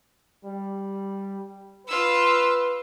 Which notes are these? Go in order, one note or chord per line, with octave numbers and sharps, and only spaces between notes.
G3
F4 B4 E6